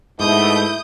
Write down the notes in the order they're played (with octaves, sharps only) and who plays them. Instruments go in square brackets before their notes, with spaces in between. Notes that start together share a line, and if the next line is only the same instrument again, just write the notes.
[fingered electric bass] G#2 [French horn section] B2 A3 D#4 [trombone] E4 [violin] D#6 G6